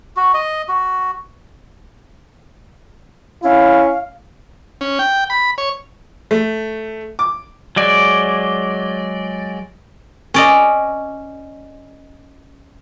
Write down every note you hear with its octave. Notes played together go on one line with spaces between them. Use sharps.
F#4
D#5
F#4
C#4 E4 F5
C#4
G5
B5
C#5
A3
D6
F#3 G#3 D5
C#4 D5 D#5